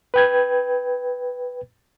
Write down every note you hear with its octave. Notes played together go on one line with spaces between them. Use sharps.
B4 G5 G#6